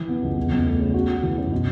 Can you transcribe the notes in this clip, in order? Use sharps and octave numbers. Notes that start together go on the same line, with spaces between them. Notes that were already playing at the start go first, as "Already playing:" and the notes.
Already playing: E3
B3
C#2
E2
E2
A3
C#3
F#4
F#4
E3
F#2
B2